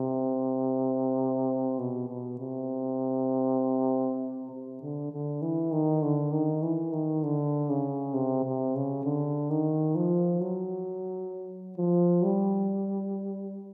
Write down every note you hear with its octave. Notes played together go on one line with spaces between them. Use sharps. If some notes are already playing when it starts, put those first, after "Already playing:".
Already playing: C3
B2
B2
C3
C3
D3
D3
E3
D#3
D3
D#3
E3
D#3
D3
C#3
C3
C3
C#3
D3
D#3
F3
F#3
F3
G3